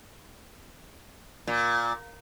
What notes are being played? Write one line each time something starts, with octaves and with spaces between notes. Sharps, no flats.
A#2